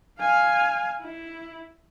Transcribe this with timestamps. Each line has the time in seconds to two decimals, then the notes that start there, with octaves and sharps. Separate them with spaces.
0.19 F5 G#5
1.01 E4